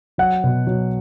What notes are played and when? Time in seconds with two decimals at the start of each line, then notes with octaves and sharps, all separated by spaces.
0.18 F#3 F#5
0.44 B2
0.67 F#3